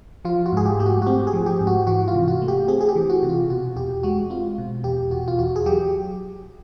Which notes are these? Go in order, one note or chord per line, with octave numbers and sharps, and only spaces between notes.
F3 F4
F#4
G#2 G#4
G4
A3 G4
F#4
F#4
C4 G4
G#4
F3
G4
G#2
F#4
E3 F#4
F4
C3
F#4
A3
G4
C4 G#4
G#4
G4
E3
F#4
C3
F4
B2 F#4
E2 G4
G#3 F#4
C4 F4
B2
E2 G4
B2 F#4
F4
E2 F#4
G#4
F#3 G4